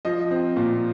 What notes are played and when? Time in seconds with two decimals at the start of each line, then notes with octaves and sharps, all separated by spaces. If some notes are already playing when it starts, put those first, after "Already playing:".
0.05 F3 D#5
0.31 C4
0.56 A#2